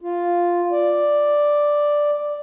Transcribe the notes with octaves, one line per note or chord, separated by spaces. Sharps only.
F4
D5